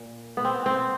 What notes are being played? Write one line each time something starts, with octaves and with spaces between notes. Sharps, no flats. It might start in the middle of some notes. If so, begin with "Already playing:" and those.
Already playing: A#2
B3
C4
C4